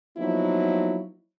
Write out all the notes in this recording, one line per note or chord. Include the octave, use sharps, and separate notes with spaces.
F3 F#3 A#3 B3 D#4 E4